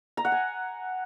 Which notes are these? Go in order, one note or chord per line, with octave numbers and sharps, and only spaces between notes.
A#5
F#5
G#5